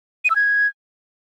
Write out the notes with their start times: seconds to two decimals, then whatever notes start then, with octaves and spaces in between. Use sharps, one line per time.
0.25 D#7
0.30 E6
0.36 G#6